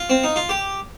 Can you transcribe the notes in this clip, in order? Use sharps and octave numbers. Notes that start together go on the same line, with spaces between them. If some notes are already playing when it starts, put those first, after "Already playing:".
Already playing: F4
C4
D#4
F4
G4